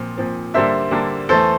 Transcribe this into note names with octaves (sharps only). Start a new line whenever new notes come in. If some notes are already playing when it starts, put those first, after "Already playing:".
Already playing: A#2 F3 C4
A#2 F3 C4
D3 G3 A#3 D4 C5 E5
D3 G3 A#3 D4
E2 E3 A3 A4 C5